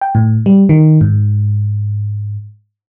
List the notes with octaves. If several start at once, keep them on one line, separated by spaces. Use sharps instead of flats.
G5
A2
G3
D#3
G#2